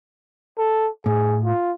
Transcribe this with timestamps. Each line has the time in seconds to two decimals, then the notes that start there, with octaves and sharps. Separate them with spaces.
0.58 A4
1.06 A2 G#4
1.44 F4